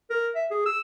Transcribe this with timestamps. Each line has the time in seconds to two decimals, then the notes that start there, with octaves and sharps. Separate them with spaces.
0.10 A#4
0.35 E5
0.51 G#4
0.66 E6